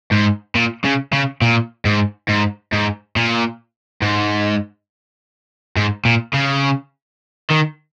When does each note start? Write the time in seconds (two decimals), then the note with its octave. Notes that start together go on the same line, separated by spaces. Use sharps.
0.12 G#2
0.55 A#2
0.84 C#3
1.13 C#3
1.42 A#2
1.85 G#2
2.29 G#2
2.73 G#2
3.16 A#2
4.02 G#2
5.76 G#2
6.05 A#2
6.34 C#3
7.50 D#3